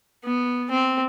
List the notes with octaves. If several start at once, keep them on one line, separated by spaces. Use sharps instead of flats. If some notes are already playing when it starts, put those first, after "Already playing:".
B3
C4